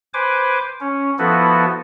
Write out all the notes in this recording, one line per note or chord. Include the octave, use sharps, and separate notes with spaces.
B4 C5 G#5 D6
C#4
F3 B3 E4 F#4 A4 B4